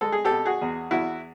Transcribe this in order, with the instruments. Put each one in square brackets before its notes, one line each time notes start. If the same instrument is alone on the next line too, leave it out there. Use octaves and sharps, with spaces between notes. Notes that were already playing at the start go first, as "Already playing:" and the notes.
[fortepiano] G#3 A4
G#4
G4 A4
B2
F#4 G#4
E2
E2 E4 F#4